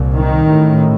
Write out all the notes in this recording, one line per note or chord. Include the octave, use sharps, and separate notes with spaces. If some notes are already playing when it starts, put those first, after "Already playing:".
Already playing: C2 A#2
D#3
A1 A2